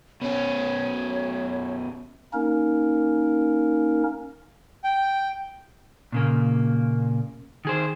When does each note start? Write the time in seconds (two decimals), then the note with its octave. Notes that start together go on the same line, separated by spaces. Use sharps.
0.22 B2 C#4 C#5
2.33 A#3 C#4 D#4 A#4
4.84 G5
6.12 A#2 C#3 A#3
7.65 D#3 G#4 C5